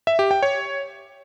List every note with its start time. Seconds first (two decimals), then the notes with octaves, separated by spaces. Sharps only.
0.07 E5
0.19 G4
0.31 G5
0.43 C#5